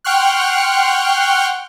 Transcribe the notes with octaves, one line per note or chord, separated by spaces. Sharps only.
F#5 G5 C6 C#6 F6 F#6